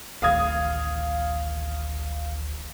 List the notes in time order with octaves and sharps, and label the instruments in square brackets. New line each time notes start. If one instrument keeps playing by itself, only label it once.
[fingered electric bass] D1 A1 D#3 [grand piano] F5 D#6 G#6